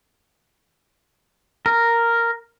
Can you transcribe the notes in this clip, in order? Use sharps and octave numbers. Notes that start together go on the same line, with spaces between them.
A#4